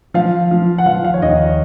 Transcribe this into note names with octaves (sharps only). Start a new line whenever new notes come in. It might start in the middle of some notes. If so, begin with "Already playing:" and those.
F3 F5
F3
F#5
F3 F5
F5
C#5
D#2 D#5